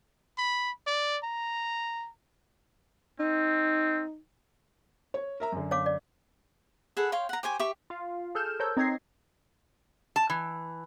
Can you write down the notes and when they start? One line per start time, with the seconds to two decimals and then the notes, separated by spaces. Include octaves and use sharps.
0.38 B5
0.87 D5
1.23 A#5
3.20 C4 D#4
5.14 C#5
5.40 A#4 E5 A#5
5.52 F#2 D3
5.71 C#5 F5 D6
5.86 D5
6.97 G#4 A4 B4 F#5
7.12 C#5 F5 G5 C6
7.29 F#5 A#5
7.43 G4 C5 G#5 C#6
7.60 G4 E5 C#6
7.90 F4 F5
8.35 G#4 A4 F6 G6 E7
8.60 A#4 C5 C#5 A5 E6 G6
8.77 C4 D#4 C#5 G#6 A#6 C7
10.16 A5
10.30 E3